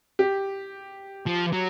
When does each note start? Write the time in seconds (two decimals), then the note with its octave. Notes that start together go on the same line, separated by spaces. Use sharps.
0.19 G4
1.26 F3
1.53 F#3